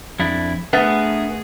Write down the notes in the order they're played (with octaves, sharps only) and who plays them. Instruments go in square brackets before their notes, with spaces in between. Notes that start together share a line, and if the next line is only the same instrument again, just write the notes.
[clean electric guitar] F2 D4 E4
[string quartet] A3 G#4 [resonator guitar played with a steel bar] B3 [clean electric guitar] D4 A#4 E5